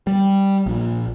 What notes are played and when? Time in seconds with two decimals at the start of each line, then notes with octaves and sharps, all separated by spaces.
0.07 G3
0.66 A#1